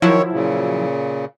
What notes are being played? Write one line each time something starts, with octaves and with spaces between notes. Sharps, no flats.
D#3 F3 F#3 E4 C#5
A#2 C#3